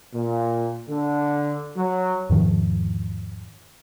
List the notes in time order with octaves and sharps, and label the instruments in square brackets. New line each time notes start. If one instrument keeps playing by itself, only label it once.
[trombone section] A#2
D3
F#3
[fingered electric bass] E2 G#2 D#3 F3